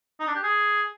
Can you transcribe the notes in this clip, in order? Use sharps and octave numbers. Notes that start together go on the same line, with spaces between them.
D#4
D4
G4
G#4